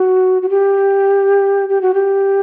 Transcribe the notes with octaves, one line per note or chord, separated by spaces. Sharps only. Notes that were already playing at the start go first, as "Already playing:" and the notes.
Already playing: F#4
F#4
G4
G4
F#4
G4